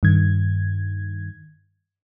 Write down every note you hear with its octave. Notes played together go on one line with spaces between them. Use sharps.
G2 D#3 G#6